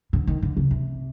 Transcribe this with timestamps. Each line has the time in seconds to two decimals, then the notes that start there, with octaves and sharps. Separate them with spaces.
0.13 D3
0.27 D#3
0.42 D3
0.57 C#3
0.71 C3